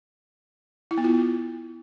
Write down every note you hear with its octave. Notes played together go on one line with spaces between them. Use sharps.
E4
B3
F4